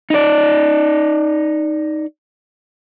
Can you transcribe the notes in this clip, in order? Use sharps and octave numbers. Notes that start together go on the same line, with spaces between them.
D#4 D5